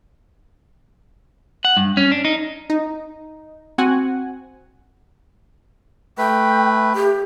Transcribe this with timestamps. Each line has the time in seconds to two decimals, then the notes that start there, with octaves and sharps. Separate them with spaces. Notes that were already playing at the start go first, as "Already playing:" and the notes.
1.65 F#5
1.77 G2
1.97 C#4
2.12 D4
2.25 D#4
2.70 D#4
3.78 C4 F#4 F#5 G#5
6.18 A3 B4 G5
6.95 G4